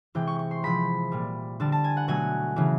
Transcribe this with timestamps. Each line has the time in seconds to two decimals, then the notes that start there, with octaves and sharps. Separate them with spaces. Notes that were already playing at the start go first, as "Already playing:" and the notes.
0.15 C3 E3 G#3 G5
0.27 C#6
0.39 C#6
0.51 C6
0.63 C3 F3 G#3 B5
1.12 A#2 G3
1.60 D3 G3 A5
1.72 A5
1.84 G#5
1.97 F#5
2.08 B2 F#3 A3 G#5
2.56 C#3 E3 A3